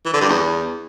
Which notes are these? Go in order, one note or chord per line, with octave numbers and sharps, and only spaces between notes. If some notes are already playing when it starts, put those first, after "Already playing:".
E3
D3
G2
E2